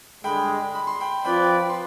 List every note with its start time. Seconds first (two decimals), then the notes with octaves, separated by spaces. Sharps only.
0.24 G2 D3 G#3 G5 B5
0.75 B5
0.87 C6
1.00 G5 B5
1.25 F3 C4 F4 B4 D5 G5 B5
1.69 C6